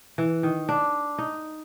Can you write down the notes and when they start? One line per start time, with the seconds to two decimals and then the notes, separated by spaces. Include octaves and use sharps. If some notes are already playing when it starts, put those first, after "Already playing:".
0.18 E3
0.43 D#3
0.69 D4
1.18 D#4